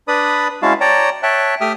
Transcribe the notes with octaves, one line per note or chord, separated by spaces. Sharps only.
D4 B4 D5 B5 D#6
G#3 C#4 E4 F#4 F5 A5
C#5 D5 G5 A5 A#5
C#5 E5 G5 A5 F#6
A3 G4 E5 G5 D#6 F6